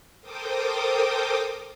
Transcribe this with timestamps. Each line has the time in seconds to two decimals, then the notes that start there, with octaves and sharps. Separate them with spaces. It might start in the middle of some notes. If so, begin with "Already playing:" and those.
0.21 A4 A#4 C5 G5 D6 D#6